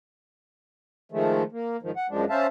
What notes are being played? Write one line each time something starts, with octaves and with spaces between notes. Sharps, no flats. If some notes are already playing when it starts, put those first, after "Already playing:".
D#3 F3 G#3 A3
A#3
G#2 D#3 F3
F#5
F#2 F3 G#3 D4
C#4 C5 E5 F5 A5